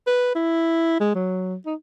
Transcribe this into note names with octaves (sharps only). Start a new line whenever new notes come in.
B4
E4
G#3
F#3
D#4